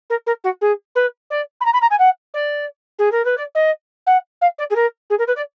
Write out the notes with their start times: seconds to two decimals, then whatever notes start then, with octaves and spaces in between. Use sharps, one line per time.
0.10 A#4
0.26 A#4
0.44 F#4
0.61 G#4
0.95 B4
1.30 D5
1.60 B5
1.65 A#5
1.73 B5
1.81 A#5
1.90 G#5
1.99 F#5
2.34 D5
2.98 G#4
3.11 A#4
3.25 B4
3.37 D5
3.55 D#5
4.06 F#5
4.41 F5
4.58 D5
4.70 G#4
4.75 A#4
5.10 G#4
5.18 A#4
5.27 B4
5.36 D5